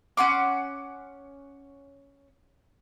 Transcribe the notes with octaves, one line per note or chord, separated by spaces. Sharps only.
C#4 F#5 C6 D6